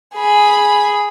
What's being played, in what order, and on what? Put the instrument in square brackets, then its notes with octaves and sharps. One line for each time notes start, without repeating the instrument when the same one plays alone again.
[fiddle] G#4 B5